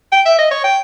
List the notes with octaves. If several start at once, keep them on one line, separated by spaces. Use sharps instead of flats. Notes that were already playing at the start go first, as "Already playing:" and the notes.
G5
E5
D#5
C#5
G5